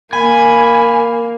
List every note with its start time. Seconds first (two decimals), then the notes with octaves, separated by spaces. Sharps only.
0.13 A#3 G#5 B5